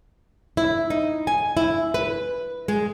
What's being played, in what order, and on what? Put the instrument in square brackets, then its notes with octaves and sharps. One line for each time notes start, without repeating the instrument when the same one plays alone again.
[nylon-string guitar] E4
D#4
G#5
E4
B4
G#3